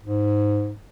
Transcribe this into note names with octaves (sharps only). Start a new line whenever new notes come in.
G#2